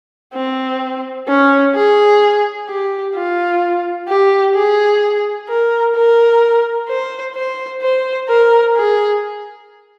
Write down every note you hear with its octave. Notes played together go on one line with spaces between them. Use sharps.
C4
C#4
G#4
G4
F4
G4
G#4
A#4
A#4
C5
C5
C5
A#4
G#4